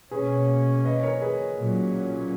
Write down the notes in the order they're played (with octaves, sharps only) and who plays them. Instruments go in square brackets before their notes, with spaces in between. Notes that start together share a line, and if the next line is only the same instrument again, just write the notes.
[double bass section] B2 A#3 C#4 [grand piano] G#4 B4
[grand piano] B4 D#5
A#4 C#5
G#4 B4
[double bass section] A#2 F#3 C#4